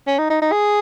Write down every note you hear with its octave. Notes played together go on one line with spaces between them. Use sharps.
C#4
D#4
D#4
D#4
G#4